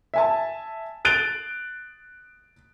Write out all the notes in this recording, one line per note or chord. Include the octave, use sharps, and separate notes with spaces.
E5 G#5 A5
F#6 A6 D7 F7 G7